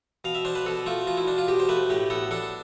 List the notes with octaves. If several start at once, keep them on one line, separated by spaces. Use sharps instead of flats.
B2 F5
E5
D4 C5
B4
B2 A4
A3 F4
B2 F4
E4
D4
F4
B2 G4
C5
A3 B4
A2 G4
B3 A4
D4 A4